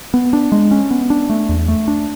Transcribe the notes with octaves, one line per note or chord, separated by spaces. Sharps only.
B3
D4
G#3
C#4
B3
D4
A3
E2
A3
D4